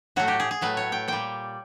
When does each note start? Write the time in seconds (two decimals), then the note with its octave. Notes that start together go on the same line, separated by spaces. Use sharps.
0.16 A2 F#3 A3 F#4
0.28 G4
0.40 G#4
0.51 G#4
0.61 A2 F#3 A3 B4
0.77 C#5
0.92 G5
1.08 A#2 G3 G5